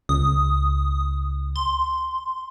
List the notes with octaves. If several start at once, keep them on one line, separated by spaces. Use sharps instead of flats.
C#2 D#6
C6